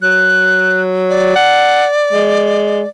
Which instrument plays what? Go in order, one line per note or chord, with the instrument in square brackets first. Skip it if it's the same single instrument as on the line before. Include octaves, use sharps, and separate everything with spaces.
[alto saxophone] F#3 [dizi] F#6
[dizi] D5
[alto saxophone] F#5
G#3